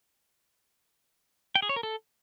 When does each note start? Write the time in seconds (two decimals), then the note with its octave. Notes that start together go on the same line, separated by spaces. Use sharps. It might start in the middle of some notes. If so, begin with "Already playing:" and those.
1.55 G5
1.62 G#4
1.69 C#5
1.76 A#4
1.83 A4